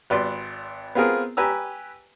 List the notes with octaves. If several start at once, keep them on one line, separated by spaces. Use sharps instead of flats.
G#1 B4 D5 C6
B3 C4 F4 G#4 A#4
G4 B4 G#5 A#5 E6